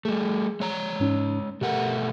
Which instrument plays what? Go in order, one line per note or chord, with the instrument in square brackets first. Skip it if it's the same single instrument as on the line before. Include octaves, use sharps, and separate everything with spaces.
[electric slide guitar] G3 A3 [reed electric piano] G#4
[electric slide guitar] G#3 C#5 A#5
[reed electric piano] G#2 C#4 D#4
[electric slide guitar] B2 A3 F#5 [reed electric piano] G4 A#4